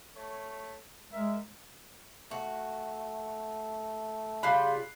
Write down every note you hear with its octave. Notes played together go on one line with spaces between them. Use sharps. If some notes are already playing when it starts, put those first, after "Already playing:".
A3 C#5
G#3 A#4 E5
A3 F#4
C#3 G3 F4 B5 F#6 C7